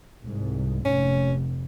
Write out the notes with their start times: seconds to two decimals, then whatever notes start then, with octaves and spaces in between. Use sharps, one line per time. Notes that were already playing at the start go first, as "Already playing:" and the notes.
0.24 C2 G#2
0.85 F1 C#4